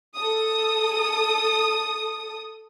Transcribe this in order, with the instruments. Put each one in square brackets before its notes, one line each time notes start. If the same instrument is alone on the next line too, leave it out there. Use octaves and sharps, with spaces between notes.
[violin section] A4 D#6